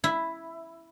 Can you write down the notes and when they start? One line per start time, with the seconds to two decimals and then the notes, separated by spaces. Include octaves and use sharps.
0.04 E4